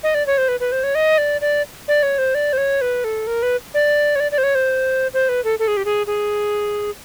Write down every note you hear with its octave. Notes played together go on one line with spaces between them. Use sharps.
D#5
D5
C#5
C5
B4
B4
C5
C#5
D#5
D5
D5
D5
C#5
C5
D5
C5
C#5
B4
A4
A#4
B4
D5
C#5
D5
D5
C5
C#5
C5
C5
B4
A4
A4
G#4
G4
G#4
G#4